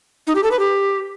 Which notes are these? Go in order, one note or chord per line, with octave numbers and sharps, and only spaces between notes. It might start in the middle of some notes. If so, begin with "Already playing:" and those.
D#4
G4
A4
B4
G4